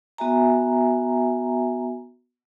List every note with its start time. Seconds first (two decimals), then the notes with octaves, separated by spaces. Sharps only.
0.18 B3 F#4 E5 G#5 A#5